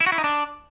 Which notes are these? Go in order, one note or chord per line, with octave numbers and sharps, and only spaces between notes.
E4
F#4
E4
D#4
D4